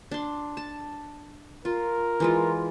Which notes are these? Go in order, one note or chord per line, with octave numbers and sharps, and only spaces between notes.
D4 C6
A5
F4 A#4
E3 G#3 F4